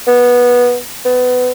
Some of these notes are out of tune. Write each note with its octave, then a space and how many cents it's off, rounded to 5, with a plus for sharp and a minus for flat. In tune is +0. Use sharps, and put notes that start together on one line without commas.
B3 -15
B3 +25